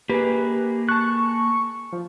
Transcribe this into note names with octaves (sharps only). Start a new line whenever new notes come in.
A#3 G4 G#4 B4
A5 C#6 F#6
F3